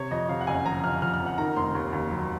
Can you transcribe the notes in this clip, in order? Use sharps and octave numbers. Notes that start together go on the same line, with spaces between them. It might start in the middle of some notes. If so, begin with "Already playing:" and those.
Already playing: C3 C#5
F2 D#5
C3 F5
F#5
F#1 G#5
F3 A#5
F3 F6
F3 F6
F6
F2
F#5
D#3 A#5
F1 C6
D#2
D#2
F#3